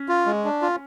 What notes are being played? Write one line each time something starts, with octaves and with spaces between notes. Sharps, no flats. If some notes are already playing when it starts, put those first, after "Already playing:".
Already playing: C#4
F4
G#3
D4
F4